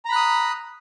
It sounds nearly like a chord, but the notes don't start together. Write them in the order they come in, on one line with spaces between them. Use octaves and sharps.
A#5 B5 F#6 D#6